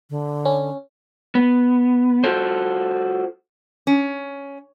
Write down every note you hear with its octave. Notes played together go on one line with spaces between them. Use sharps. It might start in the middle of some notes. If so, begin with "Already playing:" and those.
D3
C#4
B3
F4 F#4 A4 C5
C#4